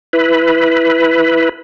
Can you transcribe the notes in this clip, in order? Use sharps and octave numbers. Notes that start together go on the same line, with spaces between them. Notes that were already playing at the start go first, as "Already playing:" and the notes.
E4 B4